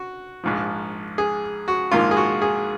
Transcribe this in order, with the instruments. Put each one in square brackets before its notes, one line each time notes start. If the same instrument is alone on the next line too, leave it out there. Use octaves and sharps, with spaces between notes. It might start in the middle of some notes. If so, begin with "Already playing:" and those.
Already playing: [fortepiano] F#4
A#1 G#2 F3
G#4
F#4
A#1 G#2 D#3 A#3 F4
G#4
F#4
G#4